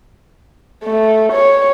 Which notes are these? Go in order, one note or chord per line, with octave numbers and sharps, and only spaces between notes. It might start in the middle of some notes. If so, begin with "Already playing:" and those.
A3
C#5